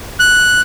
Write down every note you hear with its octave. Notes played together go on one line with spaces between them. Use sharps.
F#6